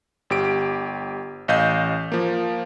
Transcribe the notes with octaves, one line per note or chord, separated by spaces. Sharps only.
G1 G4 D7
A1 D#5 F5 G6
F3 A#3